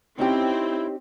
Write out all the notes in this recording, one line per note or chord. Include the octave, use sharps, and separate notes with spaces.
C4 C#4 D#4 E4 G4